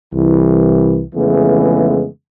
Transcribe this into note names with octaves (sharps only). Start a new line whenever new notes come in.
C2 E3
F2 C#3 E3 G#3 A3 B3